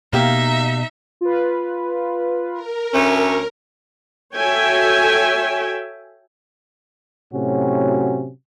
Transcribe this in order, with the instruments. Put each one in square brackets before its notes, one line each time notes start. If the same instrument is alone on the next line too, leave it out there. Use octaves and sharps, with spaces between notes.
[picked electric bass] B2 [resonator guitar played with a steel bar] A#3 G4 F5 [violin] D#4 E5
[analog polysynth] F4 B4
[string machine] A#4
[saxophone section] D2 A3 C#4
[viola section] F#4 A4 C#5 E5 G5 G#5
[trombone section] A2 C3 F#3 C#4 F#4